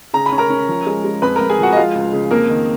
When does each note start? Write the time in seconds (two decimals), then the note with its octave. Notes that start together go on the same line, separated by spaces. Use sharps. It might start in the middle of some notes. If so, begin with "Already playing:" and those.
0.14 C#3 A#5
0.26 B5
0.32 C#4
0.38 A#4 A#5
0.50 C#4
0.68 F3
0.86 G#3
1.04 G#3
1.22 F2 B4 B5
1.36 A#4 A#5
1.41 F2
1.50 G#4 G#5
1.59 F3 F#4 F#5
1.72 D#5
1.76 G#3 F4 F5
1.95 C#2
2.13 C#3
2.31 F2 A#3 A#4
2.50 D#3